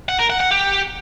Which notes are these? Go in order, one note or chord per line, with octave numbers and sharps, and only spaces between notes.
F#5
A#4
F#5
F#5
G4